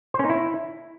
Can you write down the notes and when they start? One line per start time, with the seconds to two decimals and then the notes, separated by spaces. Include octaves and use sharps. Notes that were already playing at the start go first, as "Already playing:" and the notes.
0.14 C5
0.19 C#4
0.24 D#4
0.30 E4